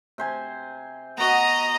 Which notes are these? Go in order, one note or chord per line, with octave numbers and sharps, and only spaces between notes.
C3 C5 G#5
B3 F#4 D#5 A#5